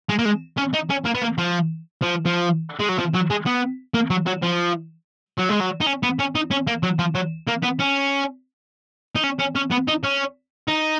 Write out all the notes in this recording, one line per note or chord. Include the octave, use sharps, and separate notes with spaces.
G#3
A#3
G#3
C#4
D#4
C#4
A#3
B3
A#3
F3
F3
F3
G#3
F#3
F3
F#3
G#3
B3
A#3
F#3
F#3
F3
F#3
G#3
F#3
D#4
C#4
B3
C#4
D#4
C#4
A#3
F#3
F3
F#3
A#3
B3
C#4
D#4
C#4
C#4
C#4
B3
D#4
C#4
D#4